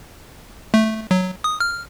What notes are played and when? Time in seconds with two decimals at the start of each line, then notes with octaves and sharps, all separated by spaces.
0.74 A3
1.11 F#3
1.44 D#6
1.60 F6